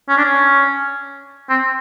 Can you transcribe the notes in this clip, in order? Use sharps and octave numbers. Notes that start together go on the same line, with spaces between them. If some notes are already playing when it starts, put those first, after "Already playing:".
C#4
D4
C#4
C4